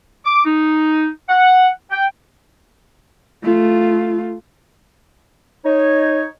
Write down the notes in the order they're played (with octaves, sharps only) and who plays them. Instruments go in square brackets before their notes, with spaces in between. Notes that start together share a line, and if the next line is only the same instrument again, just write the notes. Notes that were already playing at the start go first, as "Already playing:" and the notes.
[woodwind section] D6
D#4
F#5
G5
[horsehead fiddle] A3 F4
[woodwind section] D#4 C#5